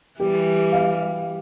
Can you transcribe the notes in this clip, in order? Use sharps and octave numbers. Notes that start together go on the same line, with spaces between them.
E3 G3 G4
F5